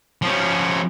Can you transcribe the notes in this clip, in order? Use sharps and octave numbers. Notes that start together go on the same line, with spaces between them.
F3 C#4